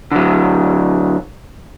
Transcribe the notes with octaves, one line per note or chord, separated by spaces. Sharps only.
D3 F#3